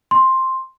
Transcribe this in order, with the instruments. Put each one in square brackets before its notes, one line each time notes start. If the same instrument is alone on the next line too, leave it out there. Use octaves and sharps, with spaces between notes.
[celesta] C6